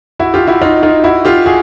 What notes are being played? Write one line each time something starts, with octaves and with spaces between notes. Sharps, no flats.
E4 F#4
F4 G4
E4 F#4
D#4 F4
D#4 F4
E4 F#4
F4 G4
F#4 G#4